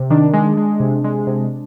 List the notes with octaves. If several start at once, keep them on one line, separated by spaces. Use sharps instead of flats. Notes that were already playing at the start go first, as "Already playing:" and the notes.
Already playing: C3
D#3 D4
G#3
G#3
C3
G#3
C3